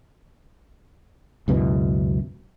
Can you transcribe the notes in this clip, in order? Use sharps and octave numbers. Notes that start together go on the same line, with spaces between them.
C#2 F#2 B2 E3